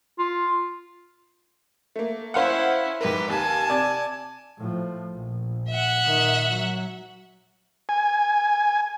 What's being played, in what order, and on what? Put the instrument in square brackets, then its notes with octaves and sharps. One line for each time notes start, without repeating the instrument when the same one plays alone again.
[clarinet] F4
[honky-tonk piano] A3 A#3
[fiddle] C#4 E4 [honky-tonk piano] C5 F5 F#5
[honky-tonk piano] G#2 A#4 [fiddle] G4 B4
[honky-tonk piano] D#2 [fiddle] G#5 A5
[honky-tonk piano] C3 D5 G#6
[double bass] A2 F3
A#1
[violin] E5 F#5
[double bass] A#2 D#3
F#3
[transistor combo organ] G#5